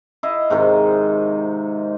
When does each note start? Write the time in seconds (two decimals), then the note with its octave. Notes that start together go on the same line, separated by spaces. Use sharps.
0.23 E4 D#5 F5
0.50 G#2 C3 D#3 D#4